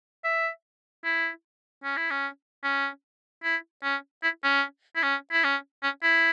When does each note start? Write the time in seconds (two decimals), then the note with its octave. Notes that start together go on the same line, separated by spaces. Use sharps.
0.24 E5
1.04 E4
1.84 C#4
1.97 E4
2.11 C#4
2.63 C#4
3.44 E4
3.83 C#4
4.23 E4
4.44 C#4
4.96 E4
5.03 C#4
5.32 E4
5.44 C#4
5.83 C#4
6.03 E4